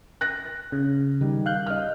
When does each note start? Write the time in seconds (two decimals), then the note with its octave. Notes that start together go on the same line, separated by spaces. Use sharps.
0.21 F#6 A#6
0.72 C#3
1.21 D#3 G3
1.46 F5 F#6 G6
1.66 D#5 F6